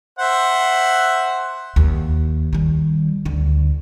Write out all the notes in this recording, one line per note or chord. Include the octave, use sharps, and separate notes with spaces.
C5 E5 F#5
D#2
D#3 G3
D2 D3